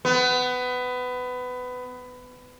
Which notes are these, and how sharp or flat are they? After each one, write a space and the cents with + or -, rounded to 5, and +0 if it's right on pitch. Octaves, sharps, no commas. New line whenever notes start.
B3 +20